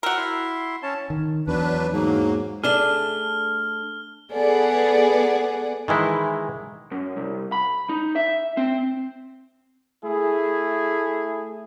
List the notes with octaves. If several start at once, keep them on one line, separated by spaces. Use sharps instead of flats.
F#4 A#4 G5 E6
E4 C6
C#4 C#5 A5
D#3
E2 F#3 D4 B4
G#2 F#3 A#3
A3 D4 G#4 F6 G7
B3 G#4 A4 D5 F#5
D#3 E3 G#3 E4
F#2
C2
B5
D#4
E5
C4
A3 E4 G#4